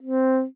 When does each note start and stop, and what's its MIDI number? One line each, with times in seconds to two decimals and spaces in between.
0.02 0.44 60